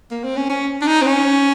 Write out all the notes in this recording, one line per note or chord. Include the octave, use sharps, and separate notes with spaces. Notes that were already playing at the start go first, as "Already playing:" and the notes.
A#3
C4
C#4
C#4
D4
D#4
C4
C#4